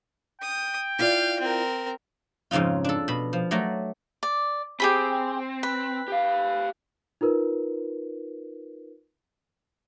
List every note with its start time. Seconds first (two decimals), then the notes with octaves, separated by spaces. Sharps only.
0.42 G5 D#6
0.99 E4 F4 D5 F5
1.40 C4 A#4
2.51 F2 G#2 C#3 D#4 F4
2.84 D4 A4
3.08 B2 B5
3.33 F3
3.51 F#3 A3 D5 A#5
4.23 D5
4.80 C4 G4 G#4 B5
5.63 B4
6.08 G4 F5
7.21 D#4 F4 A#4 B4